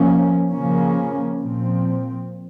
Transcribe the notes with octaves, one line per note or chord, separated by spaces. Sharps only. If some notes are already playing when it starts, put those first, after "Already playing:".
Already playing: F3 A#3 C#4
C#3 F3 A#3 C#4
A#2 F3 C4